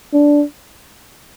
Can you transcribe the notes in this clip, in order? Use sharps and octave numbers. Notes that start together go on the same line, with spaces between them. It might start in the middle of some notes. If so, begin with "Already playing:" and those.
D4